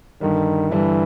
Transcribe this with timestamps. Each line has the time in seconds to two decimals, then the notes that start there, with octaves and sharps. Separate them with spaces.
0.21 G2 D3 D#3 G3
0.71 G2 D3 E3 G3